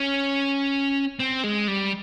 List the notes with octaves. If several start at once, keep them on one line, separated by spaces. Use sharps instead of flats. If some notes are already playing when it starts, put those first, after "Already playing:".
Already playing: C#4
C4
G#3
G3